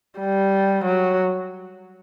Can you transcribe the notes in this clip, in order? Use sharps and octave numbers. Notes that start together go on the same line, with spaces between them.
G3
F#3